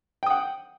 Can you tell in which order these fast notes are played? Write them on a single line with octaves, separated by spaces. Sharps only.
G5 D#6 F#5